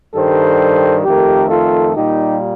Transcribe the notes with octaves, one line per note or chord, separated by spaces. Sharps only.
G2 D#3 G3 A4 C5
F2 D#3 A3 G4 A#4
F4 A4
A#2 G3 A#3 D#4 G4